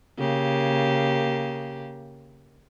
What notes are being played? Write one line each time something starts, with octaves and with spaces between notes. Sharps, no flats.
C#3 A#3 G4